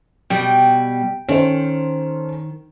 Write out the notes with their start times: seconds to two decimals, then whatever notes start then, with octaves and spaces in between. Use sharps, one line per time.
0.30 B2 G3 G5
1.29 D#3 C#4 A4 C5